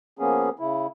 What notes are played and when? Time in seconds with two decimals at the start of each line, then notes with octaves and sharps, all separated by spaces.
0.19 F3 A#3 B3 C#4 G#4
0.59 C#3 E4